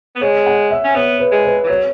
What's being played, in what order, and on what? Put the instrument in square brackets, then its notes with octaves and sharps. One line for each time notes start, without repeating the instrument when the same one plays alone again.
[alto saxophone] B3
[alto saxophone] G#3 [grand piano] C#5
[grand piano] F#5
E5
[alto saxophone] C#4
[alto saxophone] B3 [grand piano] C#5
[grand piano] B4
[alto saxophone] G#3
[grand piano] B4
[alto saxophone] E3
[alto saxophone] F#3 [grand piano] C#5